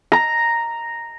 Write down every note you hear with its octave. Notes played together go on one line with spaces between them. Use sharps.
A#5